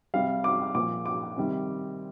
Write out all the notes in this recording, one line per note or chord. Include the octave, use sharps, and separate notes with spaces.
C3 G3 F5
D6
A#2 F3 D6
D6
C3 D#3 G3